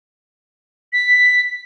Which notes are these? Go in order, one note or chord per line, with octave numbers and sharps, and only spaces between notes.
B6